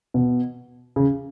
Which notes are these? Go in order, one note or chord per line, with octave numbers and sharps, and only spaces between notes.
B2
C#3